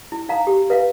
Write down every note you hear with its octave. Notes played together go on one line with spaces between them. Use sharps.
E4
D#4 F5 A#5
G4
B4 E5 F5